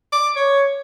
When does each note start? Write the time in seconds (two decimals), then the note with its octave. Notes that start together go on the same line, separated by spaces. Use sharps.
0.12 D6
0.36 C#5